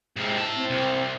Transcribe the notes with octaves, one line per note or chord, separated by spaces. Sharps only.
G#2 C3
E4 A5
C4
C2